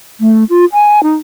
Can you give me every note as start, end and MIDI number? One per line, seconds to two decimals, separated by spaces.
0.20 0.44 57
0.49 0.65 65
0.73 1.02 80
1.03 1.14 63